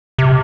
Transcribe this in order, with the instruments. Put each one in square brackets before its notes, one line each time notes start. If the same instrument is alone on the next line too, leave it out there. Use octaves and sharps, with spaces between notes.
[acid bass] C3